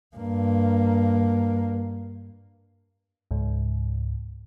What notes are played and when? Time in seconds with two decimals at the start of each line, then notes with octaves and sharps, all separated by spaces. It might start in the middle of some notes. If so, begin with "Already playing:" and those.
0.16 G2 A#3
3.31 C#2 G#2